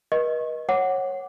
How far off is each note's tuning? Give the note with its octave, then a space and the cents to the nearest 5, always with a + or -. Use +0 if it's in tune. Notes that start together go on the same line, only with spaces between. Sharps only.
B4 -40 D#5 +0 C#6 -30
C#5 -20 F#5 +0 D6 -5